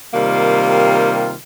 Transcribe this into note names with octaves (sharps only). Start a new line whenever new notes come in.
C3 D#3 G3 A#3 F4